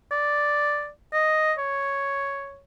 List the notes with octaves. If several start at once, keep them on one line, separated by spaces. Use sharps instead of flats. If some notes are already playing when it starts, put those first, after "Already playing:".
D5
D#5
C#5